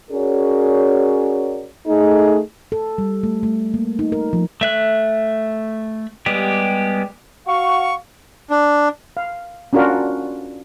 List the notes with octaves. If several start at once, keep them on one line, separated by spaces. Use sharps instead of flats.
C#4 F#4 G#4 A#4 C#5 D5
A3 D#4 G#4
A4
G3
A3
A3
A#3
D#4
A#4
F3
A3 E5 F#6
G3 G#3 B3 G4
F#4 F5 C#6
D4
F5
C#4 D4 F4 F#4 A#4